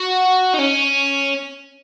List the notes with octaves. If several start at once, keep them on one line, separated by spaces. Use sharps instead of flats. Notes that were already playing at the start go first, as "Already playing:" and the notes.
Already playing: F#4
D#4
C#4